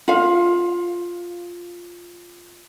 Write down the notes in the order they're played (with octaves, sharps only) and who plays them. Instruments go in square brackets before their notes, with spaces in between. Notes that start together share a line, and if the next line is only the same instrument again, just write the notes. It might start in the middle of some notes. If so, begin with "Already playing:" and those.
[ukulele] F4 F5